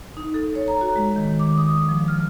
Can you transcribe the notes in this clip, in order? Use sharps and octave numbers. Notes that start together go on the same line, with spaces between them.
D#4
A4
C#5
A#5
F#4
G#3
D#3
D6
D#6
F3
F6